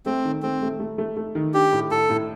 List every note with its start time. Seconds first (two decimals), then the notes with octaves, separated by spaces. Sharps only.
0.06 A3 C4
0.25 D#3
0.42 A3 C4
0.62 A3
0.80 A3
0.98 A3
1.17 A3
1.35 D#3
1.54 D4 G4
1.72 A2
1.91 A2 A4
2.10 A2